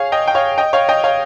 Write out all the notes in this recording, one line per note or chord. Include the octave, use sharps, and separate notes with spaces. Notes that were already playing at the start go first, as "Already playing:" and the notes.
Already playing: G#4 C#5 F5
D#5 G5
G5
C#5 F5
D#5 G5
C#5 F5
D#5 G5
C#5 F5